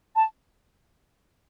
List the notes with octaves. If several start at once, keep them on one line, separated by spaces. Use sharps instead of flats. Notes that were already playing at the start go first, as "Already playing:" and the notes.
A5